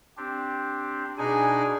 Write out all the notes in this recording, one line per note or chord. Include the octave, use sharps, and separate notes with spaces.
C4 D4 G4
B2 D4 D#4 G#4 G#5